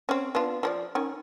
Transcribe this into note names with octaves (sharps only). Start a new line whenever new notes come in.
C4 C#4
B3 D4 F4
F3 A#4 D5
D#3 C#4